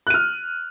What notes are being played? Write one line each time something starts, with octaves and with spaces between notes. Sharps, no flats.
F6 F#6 D#7